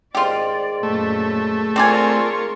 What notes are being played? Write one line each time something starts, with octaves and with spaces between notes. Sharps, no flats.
G#2 D#3 F4 G4 D5
F#2 A#2 A3
C4 F4 A#4 D5 G#5 C#6